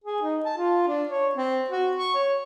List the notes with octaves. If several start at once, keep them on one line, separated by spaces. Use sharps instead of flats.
G#4
D#4
A5
F4
D4
C#5
C4
F#4
C#6
C#5